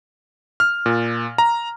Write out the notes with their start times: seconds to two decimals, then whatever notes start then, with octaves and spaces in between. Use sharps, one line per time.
0.60 F6
0.86 A#2
1.38 A#5